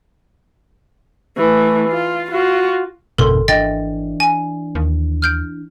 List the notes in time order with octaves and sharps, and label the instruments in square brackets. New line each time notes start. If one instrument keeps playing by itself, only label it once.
[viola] E3 A3
F4
F4 F#4
[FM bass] G#1 [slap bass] F2 B2 D3 [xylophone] A4 A#4 C6
[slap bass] E3 D4 [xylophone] D#5 G5 A6
[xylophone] G#5
[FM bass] D#2
[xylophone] F6 G6 D7